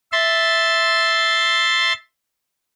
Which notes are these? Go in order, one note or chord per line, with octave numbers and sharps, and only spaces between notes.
E5 C6 A6